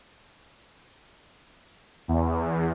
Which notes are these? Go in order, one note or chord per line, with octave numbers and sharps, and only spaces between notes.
E2